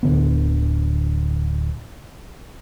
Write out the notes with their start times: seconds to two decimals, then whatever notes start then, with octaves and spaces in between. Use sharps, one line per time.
0.03 D1 D3 B3